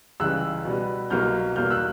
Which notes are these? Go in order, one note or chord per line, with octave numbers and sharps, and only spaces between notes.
C#2 C#3 E3 G3 E6 F#6
B2 G3 B3
C2 B2 F#3 A#3 F6 G6
E2 B2 G3 A#3 F6 G6
E6 F#6